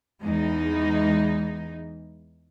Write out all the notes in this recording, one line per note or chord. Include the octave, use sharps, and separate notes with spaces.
E2 E3 G#3 D#4